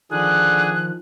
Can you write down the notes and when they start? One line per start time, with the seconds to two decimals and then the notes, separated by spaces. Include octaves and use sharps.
0.11 D3 D#3 F3 G#4 F#6